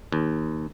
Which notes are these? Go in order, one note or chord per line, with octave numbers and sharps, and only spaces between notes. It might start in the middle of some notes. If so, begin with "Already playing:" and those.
D#2